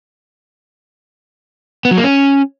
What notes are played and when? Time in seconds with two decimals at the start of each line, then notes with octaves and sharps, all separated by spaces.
1.85 B3
1.91 F#3
1.98 A#3
2.04 C#4